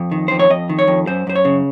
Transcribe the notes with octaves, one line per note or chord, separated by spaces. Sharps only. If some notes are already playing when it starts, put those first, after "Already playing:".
Already playing: F2
D#3
F2 C5
C#5
F2 D#5
D#3
C#5
F2
F#2 C5
F#2 C5
C#5
C#3